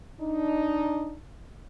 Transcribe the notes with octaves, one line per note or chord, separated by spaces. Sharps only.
D4 D#4